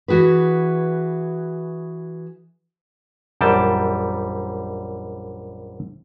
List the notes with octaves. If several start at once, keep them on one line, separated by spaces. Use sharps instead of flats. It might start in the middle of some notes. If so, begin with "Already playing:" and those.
E3 F#4 G#4 B4
A#1 F#2 E3 G3 G5 A5